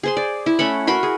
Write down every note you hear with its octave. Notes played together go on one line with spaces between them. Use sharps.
G#4 C5 C6
D5
E4
A3 C#4 F#5 B5
F#4 A#4 B5 C6
G#4